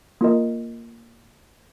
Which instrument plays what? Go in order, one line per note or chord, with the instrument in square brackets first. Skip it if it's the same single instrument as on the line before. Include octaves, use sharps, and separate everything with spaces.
[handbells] A#3 F4 A#4 D#5